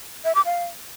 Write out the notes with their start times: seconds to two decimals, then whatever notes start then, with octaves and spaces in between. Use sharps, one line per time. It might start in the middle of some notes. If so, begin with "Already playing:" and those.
0.25 E5
0.35 D6
0.46 F5